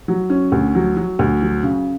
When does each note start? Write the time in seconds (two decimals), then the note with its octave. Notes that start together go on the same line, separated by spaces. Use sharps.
0.08 F#3
0.30 C#4
0.52 D2
0.75 F#3
0.97 F#3
1.19 D2
1.42 F#3
1.63 C#3